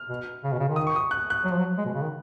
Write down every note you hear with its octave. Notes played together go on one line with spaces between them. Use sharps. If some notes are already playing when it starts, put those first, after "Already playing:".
Already playing: F6
B2
C#3
B2
C#3
D#3
D#6
C#6
D#6
F#6
F#6
F#3
F3
F#3
G#3
B2
C#3
D#3